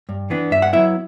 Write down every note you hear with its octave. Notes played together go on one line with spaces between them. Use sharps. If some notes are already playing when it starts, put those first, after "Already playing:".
G2
E3 B3 D4
G2 E5
F#5
F#3 B3 E4 E5